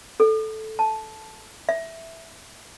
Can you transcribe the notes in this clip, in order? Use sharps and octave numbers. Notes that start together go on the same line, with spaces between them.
A4
A5
E5